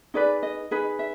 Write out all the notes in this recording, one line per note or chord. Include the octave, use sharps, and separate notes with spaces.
D#4 G#4 B4 D5
D#5
D#4 G#4 B4
E5